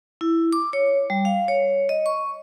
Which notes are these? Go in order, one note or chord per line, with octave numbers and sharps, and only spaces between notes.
E4
D6
C#5
G3
F5
C#5
D#5
C#6